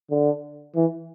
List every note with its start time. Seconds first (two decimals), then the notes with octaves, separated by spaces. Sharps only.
0.11 D3
0.76 E3